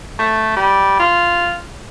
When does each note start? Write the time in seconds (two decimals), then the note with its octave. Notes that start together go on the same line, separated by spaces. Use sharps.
0.19 A3
0.56 G3
0.99 F4